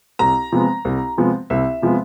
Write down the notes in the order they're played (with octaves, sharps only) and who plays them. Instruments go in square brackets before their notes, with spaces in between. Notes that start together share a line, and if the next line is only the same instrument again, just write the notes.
[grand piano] C2 [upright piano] A#5
[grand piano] C3 F3 G#3 B3
C2
C3 F3 G#3 B3
[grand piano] C2 [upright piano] E5
[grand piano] C3 F3 G#3 B3